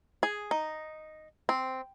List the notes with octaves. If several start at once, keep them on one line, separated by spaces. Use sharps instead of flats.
G#4
D#4
C4